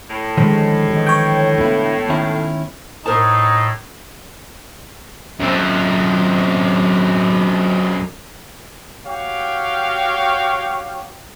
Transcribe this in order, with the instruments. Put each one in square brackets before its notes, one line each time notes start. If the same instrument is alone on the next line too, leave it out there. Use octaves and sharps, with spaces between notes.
[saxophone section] A2
[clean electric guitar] D3 D#3 F3 [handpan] G#3 C#5
[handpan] E3 G4 D#5
[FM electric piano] C#5 G5
[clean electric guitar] D3 E4 [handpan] A3 B3 F4
[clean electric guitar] D#3 C#4 E4
[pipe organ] A2 [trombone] D#4 [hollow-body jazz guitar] A#4 C5 A5
[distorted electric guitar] F#2 C4
[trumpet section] F#4 G4 C#5 F5 G5